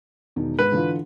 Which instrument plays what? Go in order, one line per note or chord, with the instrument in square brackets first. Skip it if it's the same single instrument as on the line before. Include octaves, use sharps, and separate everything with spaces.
[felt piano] E1 D#3
[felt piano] G#2 [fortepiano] B4
[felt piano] D3 E3 F4